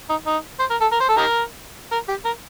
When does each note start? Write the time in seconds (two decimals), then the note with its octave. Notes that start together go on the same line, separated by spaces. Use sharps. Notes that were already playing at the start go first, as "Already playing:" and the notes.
0.09 D#4
0.27 D#4
0.59 C5
0.70 A#4
0.81 A4
0.92 A#4
1.01 C5
1.09 A4
1.17 D#4 G4 A#4
1.92 A#4
2.09 G4
2.25 A#4